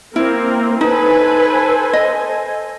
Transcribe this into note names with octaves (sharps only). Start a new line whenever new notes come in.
A#3 C4 E4 A#4
D#4 A4 B4 C5 G#5
D#5